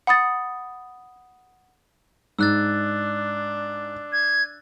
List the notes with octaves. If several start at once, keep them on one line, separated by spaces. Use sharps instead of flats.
F#5 B5 D#6 A6
G#2 D4 E6 F#6 A6
G#6